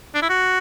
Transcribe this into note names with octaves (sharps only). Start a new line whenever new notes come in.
D4
E4
F#4